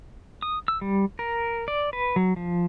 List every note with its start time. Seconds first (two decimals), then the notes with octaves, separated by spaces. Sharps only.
0.42 D#6
0.68 E6
0.81 G3
1.19 A#4
1.68 D5
1.93 B4
2.16 F#3
2.36 F3